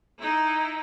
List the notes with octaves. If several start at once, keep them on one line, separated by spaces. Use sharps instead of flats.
D#4 E4